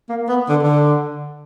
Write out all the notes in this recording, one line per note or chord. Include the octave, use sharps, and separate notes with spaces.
A#3
B3
D3
D3